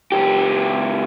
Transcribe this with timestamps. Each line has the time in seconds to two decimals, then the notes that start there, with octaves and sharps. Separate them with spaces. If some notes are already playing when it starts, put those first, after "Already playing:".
0.12 C#2 G4